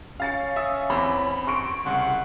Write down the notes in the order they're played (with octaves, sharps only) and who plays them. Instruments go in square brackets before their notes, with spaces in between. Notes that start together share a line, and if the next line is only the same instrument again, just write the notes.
[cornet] C#4 [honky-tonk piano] F5 A6 C#7
[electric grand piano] E5 D#6 E6
[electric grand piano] E2 C4 D6 [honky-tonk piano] B5
[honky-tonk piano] C6 C#6 D7
[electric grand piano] C2 C#3 [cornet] F#5